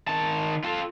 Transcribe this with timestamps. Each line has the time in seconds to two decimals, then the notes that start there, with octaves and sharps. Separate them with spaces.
0.08 D#3 A5
0.64 F4 A4